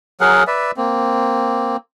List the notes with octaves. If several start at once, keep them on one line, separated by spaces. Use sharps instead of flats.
F#3 G#4 A#4 F#5
B4 D5 E5
A#3 C4